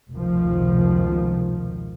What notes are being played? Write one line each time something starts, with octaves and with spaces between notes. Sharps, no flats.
F1 C#2 B2 D#3 F3